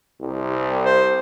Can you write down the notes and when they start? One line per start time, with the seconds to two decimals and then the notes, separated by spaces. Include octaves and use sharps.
0.20 C2
0.84 C5